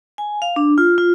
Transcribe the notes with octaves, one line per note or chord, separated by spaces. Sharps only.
G#5
F5
D4
F4
F4